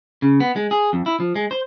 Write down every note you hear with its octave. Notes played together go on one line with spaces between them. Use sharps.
C#3
B3
G#3
G#4
F2
E4
F3
G#3
C5